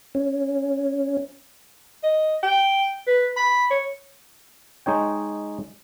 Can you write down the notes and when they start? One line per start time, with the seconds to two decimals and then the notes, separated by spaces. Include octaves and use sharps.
0.15 C#4
2.04 D#5
2.43 G5
3.07 B4
3.37 B5
3.71 C#5
4.86 G#3 D#4 C#5 G5